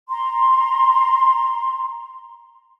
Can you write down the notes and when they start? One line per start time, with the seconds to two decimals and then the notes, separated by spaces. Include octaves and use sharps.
0.08 A#5 C6